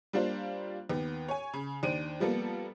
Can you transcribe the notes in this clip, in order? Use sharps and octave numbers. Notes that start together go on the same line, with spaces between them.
G3 A#3 D4 F4 C5
D#2 B3
C#5 G#5
C#3
D#2 D4 C5 D7 D#7
F3 G3 A#3 B3 A4